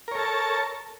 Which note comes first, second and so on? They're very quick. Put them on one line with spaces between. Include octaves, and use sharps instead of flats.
A#4 C#5 A4 A5